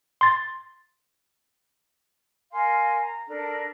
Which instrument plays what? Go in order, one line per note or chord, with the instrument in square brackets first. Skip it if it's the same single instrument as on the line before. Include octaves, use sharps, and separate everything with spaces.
[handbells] C6 A6
[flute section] A#4 F5 G#5 C6
A#5
D4 A4 A#4